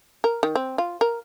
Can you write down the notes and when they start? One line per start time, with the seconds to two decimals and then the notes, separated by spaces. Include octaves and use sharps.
0.24 A#4
0.43 D#3
0.56 C4
0.78 F4
1.01 A#4